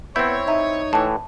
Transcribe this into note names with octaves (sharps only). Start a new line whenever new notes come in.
B3 C4 E4 C#5 G6
D#4 E5 A#5
A2 E3 A5